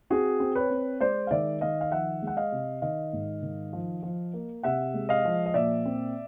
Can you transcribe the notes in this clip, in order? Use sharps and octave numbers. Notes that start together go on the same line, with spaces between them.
C4 F#4 G#4
C4
B4 C#5
C4
G#3 C5 D5
F5
D#3 D5 E5
D#3 D#5 F5
F5
F3 E5 F#5
G#3
F#5
D#5 F5
C3
D#3 D#5 F5
G#2
D#3
F3
F3
A#3
C3 E5 F#5
G#3
D#5 F5
F3
D#5
A#2 D5 E5
C4